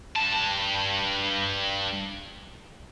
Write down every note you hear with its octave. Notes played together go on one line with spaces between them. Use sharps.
G2 A5